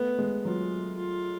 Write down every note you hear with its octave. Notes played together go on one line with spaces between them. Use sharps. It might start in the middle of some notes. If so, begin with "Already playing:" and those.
Already playing: A3 B3
G#3
F#3 F4
F4